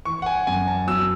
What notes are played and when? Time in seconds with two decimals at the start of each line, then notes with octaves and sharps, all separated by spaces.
0.05 E3 C#6
0.22 F#5
0.26 G#5
0.47 F#2 G#5
0.68 A5
0.87 F#3 E6